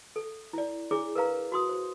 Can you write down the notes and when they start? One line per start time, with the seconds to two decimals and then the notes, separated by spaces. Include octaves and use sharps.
0.16 A4
0.53 E4 D5
0.91 D4 E4 G#4 C#5 D6
1.15 A#4 B4 F5 A#5
1.52 F#4 C6 D#6
1.69 C5